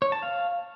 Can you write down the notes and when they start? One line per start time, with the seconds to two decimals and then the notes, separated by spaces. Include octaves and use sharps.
0.02 C#5
0.12 A5
0.22 F5